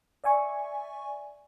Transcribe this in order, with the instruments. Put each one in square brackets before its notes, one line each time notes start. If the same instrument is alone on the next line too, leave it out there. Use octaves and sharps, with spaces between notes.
[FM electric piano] D5 E5 G#5 C#6